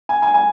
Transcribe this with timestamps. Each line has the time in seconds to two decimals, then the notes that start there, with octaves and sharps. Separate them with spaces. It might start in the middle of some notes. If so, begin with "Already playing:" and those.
0.09 G#5
0.22 G#5
0.34 G#5